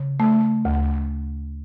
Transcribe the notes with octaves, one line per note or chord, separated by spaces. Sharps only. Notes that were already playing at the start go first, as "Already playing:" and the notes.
Already playing: C#3
A3
D2